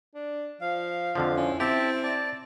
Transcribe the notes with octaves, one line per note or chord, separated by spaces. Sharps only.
D4
F3 F5
F2 D3 F3
C#4 E4
C4 G4 E5 A5
D5 A5